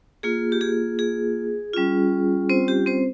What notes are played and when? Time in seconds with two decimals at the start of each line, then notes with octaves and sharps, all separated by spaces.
0.23 A#3 F4 G#4
0.52 G4
0.61 G#4
0.99 G#4
1.74 G3 C#4 F4
2.50 C4 C5
2.68 G4
2.86 C4 C5